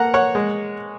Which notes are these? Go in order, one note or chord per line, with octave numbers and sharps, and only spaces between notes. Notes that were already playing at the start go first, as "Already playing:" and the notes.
Already playing: A#3 F#5 A#5
C#5 F#5
G#3